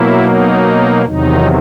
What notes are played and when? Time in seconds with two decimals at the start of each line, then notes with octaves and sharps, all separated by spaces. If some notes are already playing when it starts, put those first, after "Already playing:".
Already playing: B2 F#3 A#3 E4
0.24 D#4
1.05 E2 C3 D#3 F#3 D#4